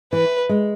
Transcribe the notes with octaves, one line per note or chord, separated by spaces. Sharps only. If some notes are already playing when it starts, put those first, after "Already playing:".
E3 B4
G#3